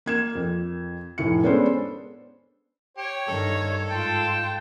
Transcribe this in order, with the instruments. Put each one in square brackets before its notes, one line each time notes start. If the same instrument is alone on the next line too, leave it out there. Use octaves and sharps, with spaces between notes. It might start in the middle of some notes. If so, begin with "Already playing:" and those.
[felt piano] A#3 G#6 E7
F2
F1 A2 C#7
G#3 B3 C#4 D4 A4 C5
[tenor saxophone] G4 [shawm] C#5
[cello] G2 D#3 [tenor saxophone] A4
[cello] G#2 F4 [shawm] G5 [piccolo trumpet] A5